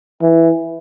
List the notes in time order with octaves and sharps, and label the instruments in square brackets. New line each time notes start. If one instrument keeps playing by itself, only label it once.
[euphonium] E3